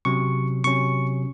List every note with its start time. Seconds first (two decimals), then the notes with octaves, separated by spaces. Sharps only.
0.05 C3 F#3 C#4 C#6
0.64 C3 F#3 C#4 C#6